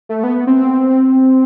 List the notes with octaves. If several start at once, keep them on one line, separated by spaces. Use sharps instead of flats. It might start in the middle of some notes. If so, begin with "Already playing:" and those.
A3
B3
C4